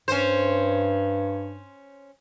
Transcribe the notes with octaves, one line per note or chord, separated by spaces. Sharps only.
G2 C#4 C5